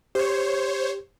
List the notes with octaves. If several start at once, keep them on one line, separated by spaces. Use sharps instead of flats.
G4 C5 C#5